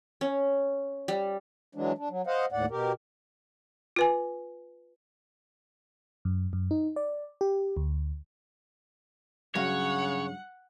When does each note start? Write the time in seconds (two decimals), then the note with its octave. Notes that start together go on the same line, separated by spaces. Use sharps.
0.21 C#4
1.08 G3
1.75 E3 F#3 G#3 D4
1.98 D4
2.10 F#3
2.27 C5 D#5 F5 F#5
2.52 D#2 A2 D5 F#5
2.70 B2 G4 A#4
3.96 F4 B4 G#5
6.25 F#2
6.53 F#2
6.71 D#4
6.96 D5
7.41 G4
7.77 D2
9.55 G2 C#3 F#3 C#5 F5 F#5